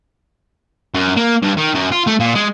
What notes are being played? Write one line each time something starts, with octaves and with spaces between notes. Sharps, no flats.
F#2
A#3
G2
D#3
F#2
F4
A3
A#2
G#3